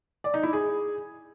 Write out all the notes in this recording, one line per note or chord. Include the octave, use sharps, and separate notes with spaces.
D5
D#4
E4
G#4